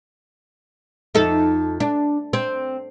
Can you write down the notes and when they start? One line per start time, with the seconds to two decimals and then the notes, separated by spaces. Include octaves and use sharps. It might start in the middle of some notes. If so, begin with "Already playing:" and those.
1.15 F2 D#4 A4
1.80 D4
2.33 C4